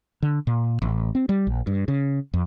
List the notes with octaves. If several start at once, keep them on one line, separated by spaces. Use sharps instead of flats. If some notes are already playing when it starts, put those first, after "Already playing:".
D3
A#2
A1
C4
G3
A#1
G2
C#3
F2